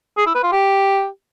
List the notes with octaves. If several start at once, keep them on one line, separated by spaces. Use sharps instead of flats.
G#4
E4
B4
F4
G4